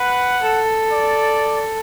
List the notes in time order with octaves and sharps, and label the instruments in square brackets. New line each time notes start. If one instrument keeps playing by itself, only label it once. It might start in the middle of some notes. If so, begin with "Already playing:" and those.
Already playing: [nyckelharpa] B4 [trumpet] F#5
[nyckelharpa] A4
[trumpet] D5